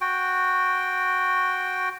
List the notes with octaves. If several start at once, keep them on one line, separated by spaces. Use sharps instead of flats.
F#4 G5